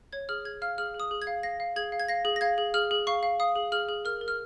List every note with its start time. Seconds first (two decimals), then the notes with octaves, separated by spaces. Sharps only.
0.13 C#5 G#6
0.29 G#4 F6
0.45 G#4 G#6
0.62 F5 F6
0.78 G#4 F6
0.94 G#4
1.00 D#6
1.11 G#4
1.22 G#6
1.27 F5
1.43 F5 A#6
1.60 F5
1.76 G#4 G#6
1.92 F5
2.00 G#6
2.08 F5 A#6
2.25 G#4
2.36 A#6
2.41 F5 G#6
2.58 G#4
2.74 G#4 F6
2.91 G#4
3.07 F5 C#6
3.23 F5
3.40 F5 D#6
3.56 G#4
3.72 G#4 F6
3.89 G#4
4.05 A#4 F6
4.21 A#4
4.28 F6